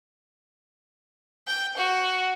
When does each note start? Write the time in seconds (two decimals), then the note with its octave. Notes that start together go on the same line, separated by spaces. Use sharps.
1.47 G5
1.77 F#4